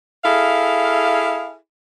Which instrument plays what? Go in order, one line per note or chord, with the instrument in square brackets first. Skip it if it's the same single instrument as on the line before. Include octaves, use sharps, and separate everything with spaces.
[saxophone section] E4 G#4 A4 F5